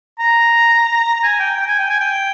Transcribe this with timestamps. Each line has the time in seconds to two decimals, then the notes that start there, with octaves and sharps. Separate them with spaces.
0.20 A#5
1.15 A#5
1.23 G#5
1.40 G5
1.57 G5
1.68 G#5
1.79 G5
1.90 G#5
2.01 G5